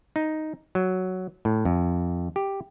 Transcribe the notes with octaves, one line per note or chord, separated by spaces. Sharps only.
D#4
F#3
A2
F2
G4